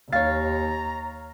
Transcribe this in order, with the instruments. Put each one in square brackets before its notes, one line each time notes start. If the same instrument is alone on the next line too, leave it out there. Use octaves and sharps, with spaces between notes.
[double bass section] D#2 [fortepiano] C#5 F5 [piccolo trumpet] A#5 [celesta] A6